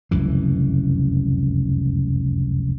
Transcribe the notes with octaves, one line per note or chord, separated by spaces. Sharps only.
F1 C#2 F#2 E3